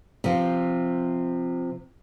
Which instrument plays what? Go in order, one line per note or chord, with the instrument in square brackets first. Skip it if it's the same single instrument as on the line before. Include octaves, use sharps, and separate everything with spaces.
[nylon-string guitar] C3 F3